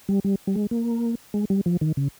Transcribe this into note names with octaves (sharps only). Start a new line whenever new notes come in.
G3
G3
G3
G#3
A#3
G#3
G3
F3
D#3
C#3